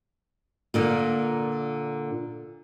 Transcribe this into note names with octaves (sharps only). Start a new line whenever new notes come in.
A#2 D3 A#3